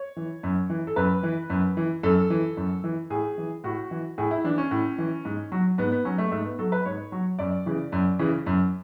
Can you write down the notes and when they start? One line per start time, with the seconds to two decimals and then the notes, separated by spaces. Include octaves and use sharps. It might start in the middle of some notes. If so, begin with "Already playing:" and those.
Already playing: C#5
0.17 E3
0.43 F#2
0.70 E3
0.87 A4
0.96 F#2 B4
1.23 E3
1.50 F#2
1.77 E3
2.03 F#2 A4
2.30 E3
2.57 F#2
2.84 E3
3.10 A2 G#4
3.38 E3
3.64 A2 F#4
3.91 E3
4.18 A2 G#4
4.31 E4
4.44 E3 D4
4.58 C#4
4.71 A2
4.98 E3
5.25 G#2
5.52 F#3
5.78 G#2 B3
5.92 B3
6.05 F#3 C#4
6.18 A3
6.32 G#2 A3
6.46 B3
6.59 F#3 A4
6.72 B4
6.86 G#2 C#5
7.12 F#3
7.39 F#2 D5
7.66 C#3 E3
7.92 F#2
8.19 C#3 E3
8.46 F#2